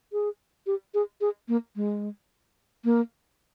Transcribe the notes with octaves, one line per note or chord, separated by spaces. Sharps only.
G#4
G4
G#4
G#4
A#3
G#3
A#3